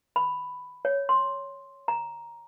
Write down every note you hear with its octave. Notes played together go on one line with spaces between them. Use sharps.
B5
C#5
C6
A#5